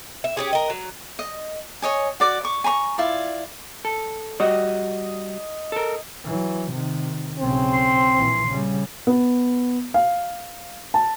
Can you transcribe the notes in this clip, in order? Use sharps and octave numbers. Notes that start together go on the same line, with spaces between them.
E5
C#4 G4 G#4
A#4 D#5
F#3
D#5
C#5 D#5 G#5
F#4 D5 D6
C#6 D6
G#5 A#5 B5 C#6
E4 F4 D5
A4
G3 F#4 D#5
A4 A#4
E3 F#3
C3 D#3
B1 C#3 C4
C6
A#1 E3
C#3 G3
B3
F5
A5